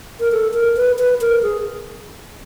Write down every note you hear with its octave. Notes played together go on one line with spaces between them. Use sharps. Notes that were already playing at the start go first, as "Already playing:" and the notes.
A#4
A4
A#4
B4
B4
A#4
G#4